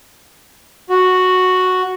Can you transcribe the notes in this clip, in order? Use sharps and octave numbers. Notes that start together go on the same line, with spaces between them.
F#4